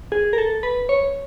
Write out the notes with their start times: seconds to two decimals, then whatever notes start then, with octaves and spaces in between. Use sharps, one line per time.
0.12 G#4
0.33 A#4
0.38 A4
0.63 B4
0.89 C#5